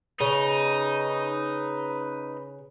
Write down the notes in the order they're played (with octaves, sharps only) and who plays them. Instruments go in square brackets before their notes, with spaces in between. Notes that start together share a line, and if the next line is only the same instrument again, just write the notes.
[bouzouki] C#3 [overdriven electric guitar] D#4 [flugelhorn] B4